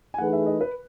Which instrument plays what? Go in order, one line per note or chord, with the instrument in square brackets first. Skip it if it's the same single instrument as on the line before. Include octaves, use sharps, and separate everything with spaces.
[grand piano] G#5
[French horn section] E3 A3 D#4 G#4 B4 [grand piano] F#5
[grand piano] E5
D#5
B4